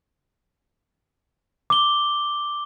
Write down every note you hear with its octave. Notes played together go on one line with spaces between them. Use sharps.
D6 G7